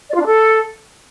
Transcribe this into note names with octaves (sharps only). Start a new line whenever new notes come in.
D5
F4
D4
A4